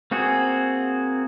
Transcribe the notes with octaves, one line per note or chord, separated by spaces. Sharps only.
A#3 C4 F#4 G#4